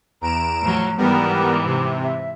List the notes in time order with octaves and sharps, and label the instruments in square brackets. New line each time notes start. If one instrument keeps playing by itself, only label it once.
[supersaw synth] E2 D7 E7 [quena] A#5
[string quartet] A2 F3 F#3
[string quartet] G#2 E3 [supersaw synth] G3 B3 A#4
[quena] D6
[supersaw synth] C3
[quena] E5